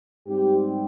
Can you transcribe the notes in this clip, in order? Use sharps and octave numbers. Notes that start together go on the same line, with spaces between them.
G#2 G3 C4 G4